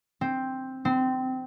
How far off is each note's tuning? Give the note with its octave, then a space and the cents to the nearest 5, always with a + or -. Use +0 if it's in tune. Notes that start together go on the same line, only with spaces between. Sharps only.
C4 +5
C4 -20